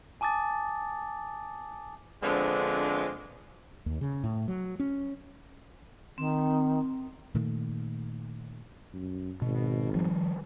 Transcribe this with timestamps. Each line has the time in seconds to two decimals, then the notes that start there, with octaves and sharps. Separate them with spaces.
0.21 G#5 A5 D6 D#6 A6
2.22 D3 F3 G#3 B3 C4 D4
3.86 D#2
4.01 C#3
4.24 A2
4.48 F#3
4.80 C#4
6.18 D#3 C4
7.34 A#2 D#3 A3 A#3
8.93 F#2
9.42 G#1 B2
9.94 D#3 F3 G3